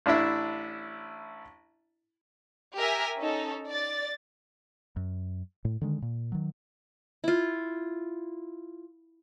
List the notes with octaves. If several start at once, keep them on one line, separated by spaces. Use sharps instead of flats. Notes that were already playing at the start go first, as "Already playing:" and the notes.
A1 D4 E4 E5
G4 A#4 E5 G#5
C#4 D#4 A4
D5 A6
F#2
A2
D3 D#3 G#3
A#2
D#3 F#3
E4 F4